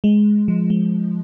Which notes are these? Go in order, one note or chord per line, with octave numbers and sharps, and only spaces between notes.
G#3
F3
G#3